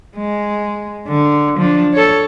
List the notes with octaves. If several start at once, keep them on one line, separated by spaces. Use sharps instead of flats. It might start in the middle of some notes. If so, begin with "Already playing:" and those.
G#3
D3
F3 D4
A4 C#5